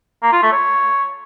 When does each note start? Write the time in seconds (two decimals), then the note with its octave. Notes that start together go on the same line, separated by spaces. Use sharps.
0.23 A#3
0.32 F4
0.42 A3
0.52 C#5